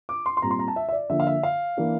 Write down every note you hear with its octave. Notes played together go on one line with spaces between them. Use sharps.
D6
C6
C6
A#2 G3 C4 A#5
C6
A#5
A5
E5
E5
D5
D3 F3 A#3 D4 E5
F5
E5
F5
E3 A#3 D4